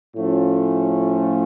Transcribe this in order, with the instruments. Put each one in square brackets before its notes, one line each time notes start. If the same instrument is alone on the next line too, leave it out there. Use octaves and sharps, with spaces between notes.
[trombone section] A2 F3 A3 C#4 F4